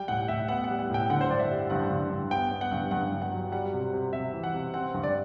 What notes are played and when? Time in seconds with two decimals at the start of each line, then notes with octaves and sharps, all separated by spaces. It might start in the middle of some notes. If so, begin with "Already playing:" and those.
Already playing: G3 G5
0.08 A2 F#5
0.28 A2 E5
0.48 B3 F#5
0.64 G3 F#5
0.79 F#5
0.90 A2 G5
1.10 D3 F#5
1.21 C5
1.30 G2 D5
1.39 E5
1.50 G3
1.70 G2 F#5
1.90 G2
2.10 G2
2.31 B3 G5
2.51 B3
2.61 F#5
2.72 G2
2.91 G2 F#5
3.12 G2
3.22 F#5
3.31 F#3
3.52 G3 F#5
3.73 C3
3.93 C3
4.13 C3 E5
4.33 E3
4.44 F#5
4.54 C3
4.74 C4 F#5
4.94 G2
5.03 D5